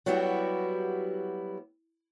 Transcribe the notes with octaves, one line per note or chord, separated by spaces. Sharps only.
F#3 G3 B3 E4 F#4 G4